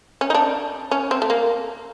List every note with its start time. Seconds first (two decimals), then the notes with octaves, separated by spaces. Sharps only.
0.21 C#4
0.30 D#4
0.35 D4
0.91 C#4
1.11 C4
1.22 A3
1.30 A#3